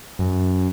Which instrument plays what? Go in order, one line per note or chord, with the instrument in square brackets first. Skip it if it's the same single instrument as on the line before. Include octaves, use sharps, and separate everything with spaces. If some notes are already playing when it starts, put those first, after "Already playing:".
[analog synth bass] F#2